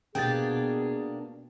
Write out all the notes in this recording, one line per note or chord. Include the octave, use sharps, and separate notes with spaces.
B2 A#3 D4 G4 G#4 G5 A6